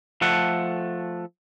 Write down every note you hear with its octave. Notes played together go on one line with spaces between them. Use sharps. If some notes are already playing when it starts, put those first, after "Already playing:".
F3 A3 A4 F#5